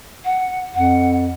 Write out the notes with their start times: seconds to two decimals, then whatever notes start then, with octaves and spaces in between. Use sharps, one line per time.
0.24 F#5
0.74 F2 F#5